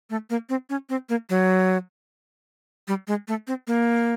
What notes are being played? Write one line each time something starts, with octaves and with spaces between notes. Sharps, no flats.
A3
A#3
C4
C#4
C4
A#3
F#3
G3
G#3
A3
C4
A#3